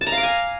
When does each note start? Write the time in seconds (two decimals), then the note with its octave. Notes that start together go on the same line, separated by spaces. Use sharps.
0.01 A5
0.07 A#5
0.12 F5
0.18 D6
0.23 G#5